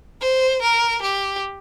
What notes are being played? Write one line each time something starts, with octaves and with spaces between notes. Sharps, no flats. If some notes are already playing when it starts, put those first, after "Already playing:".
C5
A#4
G4